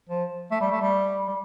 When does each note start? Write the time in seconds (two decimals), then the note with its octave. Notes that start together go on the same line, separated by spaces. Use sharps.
0.09 F3
0.51 A3
0.61 G3
0.72 A3
0.81 G3
1.28 G3